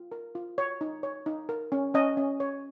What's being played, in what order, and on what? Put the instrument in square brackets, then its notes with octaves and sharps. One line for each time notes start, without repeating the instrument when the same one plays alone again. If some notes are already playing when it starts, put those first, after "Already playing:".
Already playing: [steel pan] F4
A#4
F4
C#5
D#4
C#5
D#4
A#4
C#4
C#4 D#5
C#4
C#5